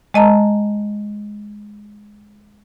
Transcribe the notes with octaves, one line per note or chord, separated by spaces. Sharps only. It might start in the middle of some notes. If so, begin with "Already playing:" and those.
G#3 D#5 A5 A#5